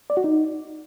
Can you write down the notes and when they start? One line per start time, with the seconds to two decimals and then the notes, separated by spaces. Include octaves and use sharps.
0.10 D5
0.17 F#4
0.24 D#4